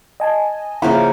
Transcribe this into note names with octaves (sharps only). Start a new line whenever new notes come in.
D#5 G#5 A5
C#3 F3 A#3 E4 F#5 B5